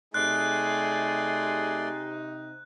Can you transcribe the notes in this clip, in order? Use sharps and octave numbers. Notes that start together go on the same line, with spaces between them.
C3 A3 D#4 G#4 D5 C6 F#6